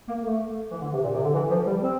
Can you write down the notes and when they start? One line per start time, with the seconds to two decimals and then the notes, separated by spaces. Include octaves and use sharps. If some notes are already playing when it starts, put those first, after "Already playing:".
0.08 A#3
0.24 A3
0.71 E3
0.81 D3
0.93 C3
1.03 A#2
1.14 C3
1.24 D3
1.34 E3
1.50 F3
1.67 G3
1.82 C4